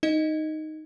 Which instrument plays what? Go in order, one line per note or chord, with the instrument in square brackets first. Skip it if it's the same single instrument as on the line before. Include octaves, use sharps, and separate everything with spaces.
[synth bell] D#4 D#5